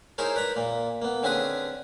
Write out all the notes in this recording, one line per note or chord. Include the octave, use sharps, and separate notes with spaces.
D#4 E4 G#4 A#4 C5 C#5
B4 D5 A#5 B5
A#2 A#3
A#3 B3
D3 C4 C#4 G#4 B4 D#6